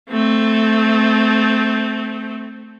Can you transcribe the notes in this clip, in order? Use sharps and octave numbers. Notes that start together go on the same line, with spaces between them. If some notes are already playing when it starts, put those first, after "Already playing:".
A3 C4